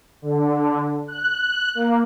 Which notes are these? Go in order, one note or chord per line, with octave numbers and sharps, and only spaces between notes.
D3
F#6
A#3